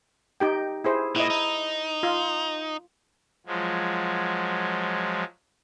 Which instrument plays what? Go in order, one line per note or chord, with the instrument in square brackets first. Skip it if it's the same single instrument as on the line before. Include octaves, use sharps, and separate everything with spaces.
[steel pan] D#4 G4 G5
E4 G#4 C5
[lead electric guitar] A#2 [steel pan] E4 D#5
[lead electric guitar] D#4
[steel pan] F4
[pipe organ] F3 F#3 G#3